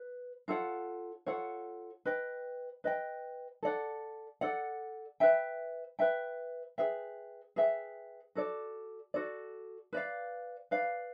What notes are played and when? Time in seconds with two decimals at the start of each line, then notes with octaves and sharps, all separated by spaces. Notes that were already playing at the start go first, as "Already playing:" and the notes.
Already playing: B4
0.48 F4 A4 C#5 F#5
1.26 F4 A4 C#5 F#5
2.05 B4 D#5 G5
2.84 B4 D#5 G5
3.63 A4 D5 F#5
4.41 A4 D5 F#5
5.20 B4 E5 G5
5.99 B4 E5 G5
6.78 G#4 B4 E5 G5
7.56 G#4 B4 E5 G5
8.35 F#4 A4 D5
9.14 F#4 A4 D5
9.93 B4 D5 F5
10.71 B4 D5 F5